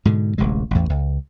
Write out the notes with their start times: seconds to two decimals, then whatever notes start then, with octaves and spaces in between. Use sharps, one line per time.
0.05 G#2 B2 D3
0.38 D1 A1 C3 G#3
0.71 A1 E2
0.90 C#2